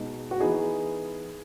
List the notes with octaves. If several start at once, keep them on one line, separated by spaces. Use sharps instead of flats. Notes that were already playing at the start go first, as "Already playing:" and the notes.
Already playing: B2 G#3 D#4
F#4
E3 B3 D#4 G#4